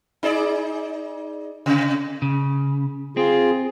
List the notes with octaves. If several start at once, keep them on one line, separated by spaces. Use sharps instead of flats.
D#4 G#4 D5
C3
C#3
C4 F4 G#4